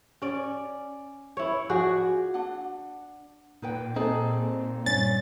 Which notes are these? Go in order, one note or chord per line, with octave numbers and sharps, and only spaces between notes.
C#4 D5
E4 C#5
F3 F#4 G#4 D5
D4 F#5
A#2 D#4 B4 G5
C4 D#4 G#4 A4
G2 C#4 A6